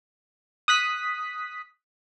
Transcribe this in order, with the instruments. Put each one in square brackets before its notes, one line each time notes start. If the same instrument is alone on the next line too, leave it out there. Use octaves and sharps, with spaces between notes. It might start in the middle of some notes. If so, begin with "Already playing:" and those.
[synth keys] D#6 F#6 B6